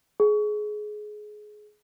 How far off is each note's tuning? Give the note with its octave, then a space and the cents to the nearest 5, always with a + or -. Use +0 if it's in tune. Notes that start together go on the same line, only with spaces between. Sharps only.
G#4 +20